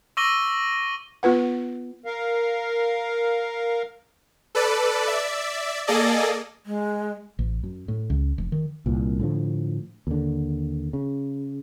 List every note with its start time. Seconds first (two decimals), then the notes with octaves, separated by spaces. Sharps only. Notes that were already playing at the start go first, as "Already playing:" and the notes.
0.17 C#6 D6 E6 A#6 D#7 G7
1.23 B3 F4 B4 F#5
2.05 A#4 F5
4.55 A4 B4 D5
5.06 D5 E5
5.87 A#3 G#4 A4 D5 D#5
6.66 G#3
7.39 A1
7.63 F#2
7.88 A2
8.10 C#2
8.38 F1
8.52 D#3
8.86 C2 A#2
9.20 A2 D3 F3
10.07 D#2 D3
10.93 C#3